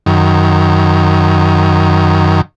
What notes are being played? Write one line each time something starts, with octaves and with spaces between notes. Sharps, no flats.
F#2 D#3